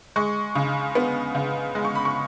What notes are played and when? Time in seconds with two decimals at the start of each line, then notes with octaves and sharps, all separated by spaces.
0.16 G#3 C#6
0.55 C#3
0.95 B3
1.35 C#3
1.75 G#3
1.85 C#6
1.95 B5
2.05 C#6